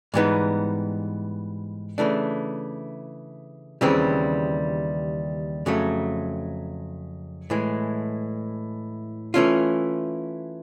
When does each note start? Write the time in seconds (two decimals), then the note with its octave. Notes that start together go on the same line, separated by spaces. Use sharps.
0.14 G#2 E3 G3 B3 D#4
1.98 C#3 E3 A3 D4
3.81 D#2 C#3 E3 G3 C4
5.66 F2 C#3 F#3 A3
7.50 A2 E3 G#3
9.34 E3 A3 C#4 F4